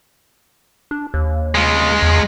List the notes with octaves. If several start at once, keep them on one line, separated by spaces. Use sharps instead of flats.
D4
D#2
G#3 F4
E2